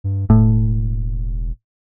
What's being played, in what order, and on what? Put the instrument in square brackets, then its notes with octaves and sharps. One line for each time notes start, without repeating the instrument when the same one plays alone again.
[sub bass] G2
[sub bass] E1 [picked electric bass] A2